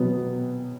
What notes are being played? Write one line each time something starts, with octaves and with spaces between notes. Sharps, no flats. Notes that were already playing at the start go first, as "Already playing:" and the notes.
Already playing: B2 F#3 B3